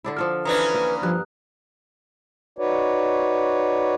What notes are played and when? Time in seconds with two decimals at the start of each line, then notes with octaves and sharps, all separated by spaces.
0.04 D3 D4 E4
0.17 F3 A4 A#4 F6
0.45 E3 C#4 D4 B4 A#5 D#6
0.74 A#3 A#4
1.03 G2 F3 F#6
2.59 D#4 F#4 B4 C#5 D5